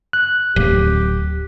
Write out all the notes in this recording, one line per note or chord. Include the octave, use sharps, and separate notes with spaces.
F#6
D1 G4